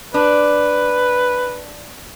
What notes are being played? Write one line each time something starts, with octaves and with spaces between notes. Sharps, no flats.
D4 B4